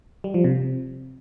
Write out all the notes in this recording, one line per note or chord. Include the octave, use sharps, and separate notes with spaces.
G3
F3
C3